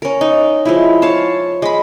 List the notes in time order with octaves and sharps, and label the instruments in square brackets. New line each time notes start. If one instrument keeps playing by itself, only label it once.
[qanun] C#4 A#4
D#4
F3 G#3 E4
C#5 F5 A5
G#3 B5